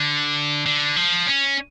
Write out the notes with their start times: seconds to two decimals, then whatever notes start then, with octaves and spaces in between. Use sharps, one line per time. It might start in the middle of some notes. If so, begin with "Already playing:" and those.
Already playing: D3
0.66 D3
0.96 F3
1.26 C#4